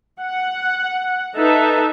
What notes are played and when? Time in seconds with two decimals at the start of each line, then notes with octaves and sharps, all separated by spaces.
0.20 F#5
1.35 D#4 A4 B4 E5